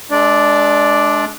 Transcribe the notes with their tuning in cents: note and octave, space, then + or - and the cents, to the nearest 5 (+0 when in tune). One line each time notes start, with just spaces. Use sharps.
G#3 +35 D4 +0 D5 +0